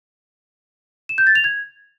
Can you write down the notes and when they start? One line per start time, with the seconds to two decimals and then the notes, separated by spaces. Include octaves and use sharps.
1.09 E7
1.18 G6
1.27 A6
1.35 F7
1.44 G#6